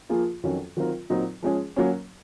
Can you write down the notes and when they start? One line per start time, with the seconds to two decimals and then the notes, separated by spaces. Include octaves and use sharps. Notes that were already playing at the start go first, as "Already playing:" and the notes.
0.09 F3 A#3 F4 G#4
0.43 F2 D#3 F#3 C#4 F#4
0.77 D#3 F#3 C4 F4 A#4
1.10 A#2 F#3 C4 D#4
1.43 F3 G#3 C#4 G#4
1.76 F#3 A#3 C#4